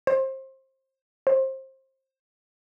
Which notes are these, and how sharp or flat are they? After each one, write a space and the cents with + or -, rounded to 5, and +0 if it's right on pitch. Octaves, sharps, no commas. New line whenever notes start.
C5 +25
C5 +25